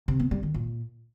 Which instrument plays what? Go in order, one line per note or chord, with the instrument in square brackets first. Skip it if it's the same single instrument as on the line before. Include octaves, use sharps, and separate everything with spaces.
[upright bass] C3
B3
G3
D#3
A#2